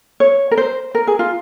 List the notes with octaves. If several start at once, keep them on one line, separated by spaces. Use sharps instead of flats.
C#5
A#4
C5
A#4
G#4
F4